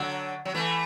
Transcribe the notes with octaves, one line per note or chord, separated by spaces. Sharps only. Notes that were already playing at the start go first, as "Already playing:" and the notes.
Already playing: D3 F#3
F#3
E3 A3